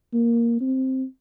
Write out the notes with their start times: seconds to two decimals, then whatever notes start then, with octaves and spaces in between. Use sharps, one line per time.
0.13 A#3
0.61 C4